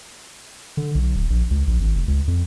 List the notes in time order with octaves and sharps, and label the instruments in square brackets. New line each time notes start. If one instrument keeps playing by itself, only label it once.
[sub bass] D3
B1
D1
A#1
C#2
A#1
G#1
F1
C#2
F2